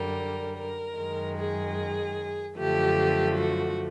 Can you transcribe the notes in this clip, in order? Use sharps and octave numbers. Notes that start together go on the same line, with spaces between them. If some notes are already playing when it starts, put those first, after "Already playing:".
Already playing: F#2 D3 G3 A#4
A#4
F#2 D#3 G#3
G#4
F#2 D3 F3 A3 G4
F#4